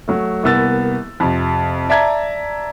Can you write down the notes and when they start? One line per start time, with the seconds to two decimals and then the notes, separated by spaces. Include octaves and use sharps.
0.08 F#3 A3
0.43 C2 A#3 B3 E6 A6
1.20 F2 C3
1.89 D5 E5 A5 A#5 G#6